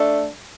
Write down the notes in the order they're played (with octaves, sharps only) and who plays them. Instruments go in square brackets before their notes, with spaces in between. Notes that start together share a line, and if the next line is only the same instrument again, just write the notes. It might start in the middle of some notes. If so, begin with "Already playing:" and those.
Already playing: [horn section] A3 D4